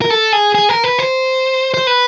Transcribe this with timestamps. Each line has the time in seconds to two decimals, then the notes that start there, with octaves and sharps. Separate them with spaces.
0.02 A#4
0.11 A4
0.33 G#4
0.55 G#4
0.69 A#4
0.84 B4
0.99 C5
1.74 C5
1.87 B4